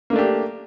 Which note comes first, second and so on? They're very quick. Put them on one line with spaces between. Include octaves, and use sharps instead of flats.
A#3 A3 D4 G4